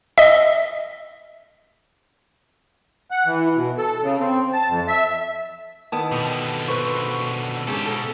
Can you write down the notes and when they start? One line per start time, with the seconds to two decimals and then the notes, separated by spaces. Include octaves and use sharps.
0.18 D#5 E5
3.11 F#5
3.26 E3
3.55 B2
3.77 A4
4.02 C#3
4.20 C4
4.53 A5
4.68 F2
4.88 E5
5.92 D#3 B3 E4 A5 D#6
6.12 B2 D3 G5 A5 C#6 D#6
6.68 B4 C5 C#6
7.67 G#2 C#3 C#4 G4 A4
7.86 B2 A4